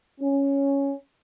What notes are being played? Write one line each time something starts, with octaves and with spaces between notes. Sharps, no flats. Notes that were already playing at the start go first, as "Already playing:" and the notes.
C#4